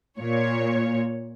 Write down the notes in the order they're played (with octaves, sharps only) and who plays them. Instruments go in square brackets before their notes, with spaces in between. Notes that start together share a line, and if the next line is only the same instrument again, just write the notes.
[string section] A#2 C#5